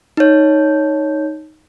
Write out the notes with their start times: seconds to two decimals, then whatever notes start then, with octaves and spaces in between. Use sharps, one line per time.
0.17 D#4 C#5